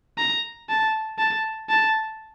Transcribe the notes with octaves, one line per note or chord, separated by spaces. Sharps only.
A#5
A5
A5
A5